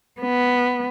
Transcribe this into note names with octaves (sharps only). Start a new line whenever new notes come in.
B3